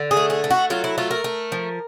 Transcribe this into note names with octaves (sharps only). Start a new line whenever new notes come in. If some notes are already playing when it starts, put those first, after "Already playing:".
Already playing: D3
G#4
A3
G#4
A3
F#4
F#3 F4
E4
A3 F4
A#4
A3
F3